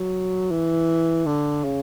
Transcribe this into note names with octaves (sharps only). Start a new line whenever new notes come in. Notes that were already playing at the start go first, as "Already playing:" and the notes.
Already playing: F#3
E3
D3
C#3